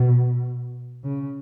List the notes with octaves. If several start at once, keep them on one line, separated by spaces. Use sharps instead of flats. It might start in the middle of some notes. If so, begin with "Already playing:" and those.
Already playing: B2
C#3